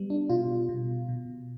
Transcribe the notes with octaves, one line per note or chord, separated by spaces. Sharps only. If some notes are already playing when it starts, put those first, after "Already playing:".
Already playing: G3 B3
D4
B2 F4
B2
B2